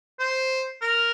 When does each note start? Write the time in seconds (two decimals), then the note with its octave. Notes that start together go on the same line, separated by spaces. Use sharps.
0.19 C5
0.82 A#4